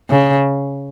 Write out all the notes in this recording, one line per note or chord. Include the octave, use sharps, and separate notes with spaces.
C#3